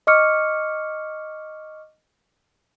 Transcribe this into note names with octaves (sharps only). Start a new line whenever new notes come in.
D#5 C#6 D6 F6 C#7